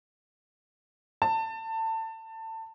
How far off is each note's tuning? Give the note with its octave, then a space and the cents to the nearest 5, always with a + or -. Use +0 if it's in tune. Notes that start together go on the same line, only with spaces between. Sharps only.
A5 +25